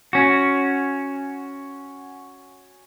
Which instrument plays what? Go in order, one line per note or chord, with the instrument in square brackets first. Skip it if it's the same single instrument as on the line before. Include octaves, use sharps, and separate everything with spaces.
[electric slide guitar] C#4 F#4